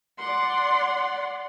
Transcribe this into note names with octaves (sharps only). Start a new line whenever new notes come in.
D5 F#5 C6